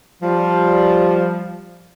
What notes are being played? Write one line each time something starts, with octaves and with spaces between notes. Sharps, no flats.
F3 G3